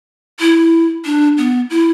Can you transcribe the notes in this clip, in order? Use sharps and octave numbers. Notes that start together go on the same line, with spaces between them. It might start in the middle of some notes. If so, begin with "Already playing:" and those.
E4
D4
B3
E4